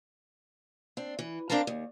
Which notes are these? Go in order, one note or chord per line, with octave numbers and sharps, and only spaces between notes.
C4 D4
E3
C4 D4 A#4 F5 A5 A#5
D#2